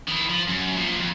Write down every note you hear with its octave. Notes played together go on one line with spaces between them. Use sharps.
D#3 E4
F3
F#2
A#2 F3
F2